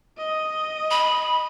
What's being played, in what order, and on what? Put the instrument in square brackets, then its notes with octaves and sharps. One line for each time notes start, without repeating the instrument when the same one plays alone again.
[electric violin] D#5
[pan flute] B5